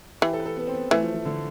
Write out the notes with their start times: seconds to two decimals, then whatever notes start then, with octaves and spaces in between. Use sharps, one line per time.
0.21 E3 G4
0.33 A4
0.40 B4
0.46 A4
0.57 B3
0.67 C4
0.74 B3
0.91 E3 A3
1.03 F3
1.14 F3
1.25 D3